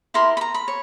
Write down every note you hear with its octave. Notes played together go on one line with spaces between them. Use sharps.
E4 G4 A#4 C6
B5
A#5
B5
C#5